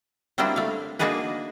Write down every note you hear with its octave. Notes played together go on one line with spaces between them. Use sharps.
F#3 G3 A#3 C4 D4 E4
A3 F5
A#3 D4 D#4 F#4 G#4 B4